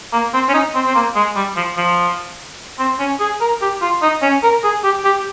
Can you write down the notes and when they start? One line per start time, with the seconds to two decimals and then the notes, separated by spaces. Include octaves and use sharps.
0.13 A#3
0.33 C4
0.49 C#4
0.54 D#4
0.74 C4
0.86 C4
0.95 A#3
1.15 G#3
1.36 G3
1.56 F3
1.77 F3
2.79 C4
2.99 C#4
3.20 G#4
3.41 A#4
3.61 G4
3.82 F4
4.02 D#4
4.22 C#4
4.43 A#4
4.64 G#4
4.84 G4
5.04 G4